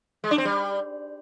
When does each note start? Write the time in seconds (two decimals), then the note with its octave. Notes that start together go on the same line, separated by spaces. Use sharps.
0.24 G#3
0.31 D4
0.38 C4
0.45 G3